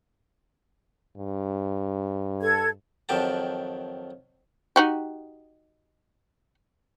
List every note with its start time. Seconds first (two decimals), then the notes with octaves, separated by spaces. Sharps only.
1.17 G2
2.41 A4 G#6
3.09 F2 D#3 F#3 G4 A5
4.76 D#4 F#4 G4